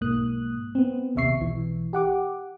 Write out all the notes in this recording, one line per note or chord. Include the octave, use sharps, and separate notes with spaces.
B1 G#2 A#3 D#6 F#6
B3 C4
A#1 D#2 C3 E5 C#6 C7
B1 E3
G4 F#5 D6